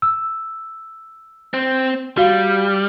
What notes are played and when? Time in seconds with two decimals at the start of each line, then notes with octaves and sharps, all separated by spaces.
0.02 E6
1.54 C4
2.17 G3 F#4 F5